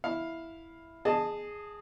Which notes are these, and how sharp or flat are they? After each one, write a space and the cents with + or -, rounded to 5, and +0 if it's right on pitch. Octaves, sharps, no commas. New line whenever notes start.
E4 +0 F5 +5
G#4 +0 D#5 -35 A5 +0